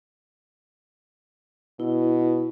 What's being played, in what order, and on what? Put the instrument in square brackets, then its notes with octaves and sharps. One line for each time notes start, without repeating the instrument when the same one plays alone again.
[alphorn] B2 [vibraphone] E4